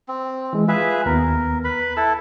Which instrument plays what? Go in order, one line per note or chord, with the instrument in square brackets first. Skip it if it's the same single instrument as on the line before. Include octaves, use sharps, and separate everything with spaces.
[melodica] C4
[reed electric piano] E3 G#3
[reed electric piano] F4 [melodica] G#4 B4 E5
[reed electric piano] D#2 B3 [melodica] A#4
[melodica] B4 B5
[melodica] E4 A4 [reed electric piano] E6